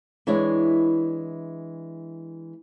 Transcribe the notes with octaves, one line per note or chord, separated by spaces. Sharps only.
E3 G#3 D4 E4 C#5